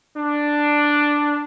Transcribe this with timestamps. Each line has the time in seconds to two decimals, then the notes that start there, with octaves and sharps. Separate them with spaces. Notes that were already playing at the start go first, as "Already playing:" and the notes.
0.16 D4